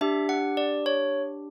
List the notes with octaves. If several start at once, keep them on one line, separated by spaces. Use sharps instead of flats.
D4 G4 E5
F#5
D5
C#5